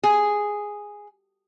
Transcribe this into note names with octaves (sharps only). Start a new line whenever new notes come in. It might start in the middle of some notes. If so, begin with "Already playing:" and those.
G#4